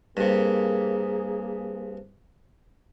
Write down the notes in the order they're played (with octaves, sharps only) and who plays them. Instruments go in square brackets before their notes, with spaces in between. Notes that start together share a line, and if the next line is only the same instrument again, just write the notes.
[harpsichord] G2 C3 [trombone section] A#3 G#4